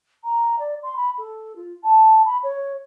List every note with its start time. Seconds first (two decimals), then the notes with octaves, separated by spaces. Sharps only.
0.24 A#5
0.59 D5
0.83 C6
0.96 B5
1.18 A4
1.56 F4
1.84 A5
2.25 B5
2.43 C#5